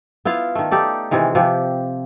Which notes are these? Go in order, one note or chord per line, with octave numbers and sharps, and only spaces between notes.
B3 E4 F4 F5
D#3 A3
D#4 G4 A4 D5
C3 D#3 E3 G#3
C3 F3 G4